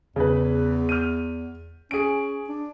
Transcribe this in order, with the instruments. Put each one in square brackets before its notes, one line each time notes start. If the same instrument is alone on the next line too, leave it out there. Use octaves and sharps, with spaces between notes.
[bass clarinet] E2 [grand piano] C#3 B4
[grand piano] F6 G6 D#7
[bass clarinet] C#4 [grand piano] G#4 D7
[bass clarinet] D4